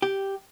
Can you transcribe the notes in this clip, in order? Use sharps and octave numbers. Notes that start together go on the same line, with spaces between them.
G4